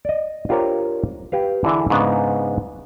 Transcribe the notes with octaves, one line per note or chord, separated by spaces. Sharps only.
D5 D#5
D4 F4 G4 A#4 C5 C#5
G4 B4 F5
D3 E3 D4 E4 G#4
G#2 C#3 B3 D4